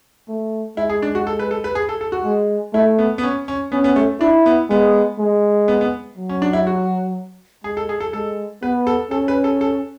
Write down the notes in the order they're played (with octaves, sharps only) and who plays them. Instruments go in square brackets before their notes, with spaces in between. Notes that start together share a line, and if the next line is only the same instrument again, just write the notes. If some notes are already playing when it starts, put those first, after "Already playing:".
[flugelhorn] A3
[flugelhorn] G#3 [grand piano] E4
[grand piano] G#4
D4
F#4
A4
B4
A4
B4
G#4
A4
A4
F#4
[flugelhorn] G#3
[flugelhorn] A3 [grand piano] E4
[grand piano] B3
B3
C#4
C#4
[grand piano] B3 [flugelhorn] C#4
[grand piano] B3
A3
[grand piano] D4 [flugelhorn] E4
[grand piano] B3
[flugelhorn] G#3 [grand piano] B3
[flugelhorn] G#3
[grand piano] B3
B3
[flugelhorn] F#3
[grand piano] C#4
D4
E4
F#4
[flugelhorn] G#3 [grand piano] G#4
[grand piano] A4
G#4
A4
[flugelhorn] G#3 [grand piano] A4
[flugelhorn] B3 [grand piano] B4
[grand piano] A4
[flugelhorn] C#4 [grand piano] A4
[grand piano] B4
A4
A4